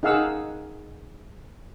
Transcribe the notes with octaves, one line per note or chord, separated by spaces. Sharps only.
D#4 G#4 F5 F#5 E6